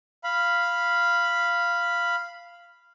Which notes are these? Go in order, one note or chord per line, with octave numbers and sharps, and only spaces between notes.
F5 B5